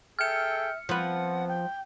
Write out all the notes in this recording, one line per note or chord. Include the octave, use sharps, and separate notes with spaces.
G#4 A4 E5 G5 F6 C#7
F3 B3 C4 B4 F#5
G5